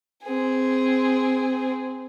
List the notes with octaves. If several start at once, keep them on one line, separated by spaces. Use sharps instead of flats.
C4 G#4